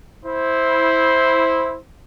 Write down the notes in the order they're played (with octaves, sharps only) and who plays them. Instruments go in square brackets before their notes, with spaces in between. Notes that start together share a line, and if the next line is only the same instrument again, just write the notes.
[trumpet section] E4 C5